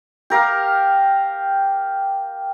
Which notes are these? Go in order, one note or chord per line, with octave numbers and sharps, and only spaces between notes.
G4 A#4 F5